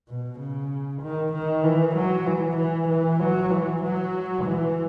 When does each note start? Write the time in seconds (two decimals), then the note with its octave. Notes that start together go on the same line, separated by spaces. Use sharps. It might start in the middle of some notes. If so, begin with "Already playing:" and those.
0.08 B2
0.39 C#3
1.02 D#3
1.33 D#3
1.64 E3
1.95 F#3
2.26 E3
2.57 E3
2.89 E3
3.20 F#3
3.51 E3
3.82 F#3
4.44 E3